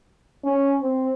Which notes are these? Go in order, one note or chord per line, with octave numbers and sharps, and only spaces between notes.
C#4
C4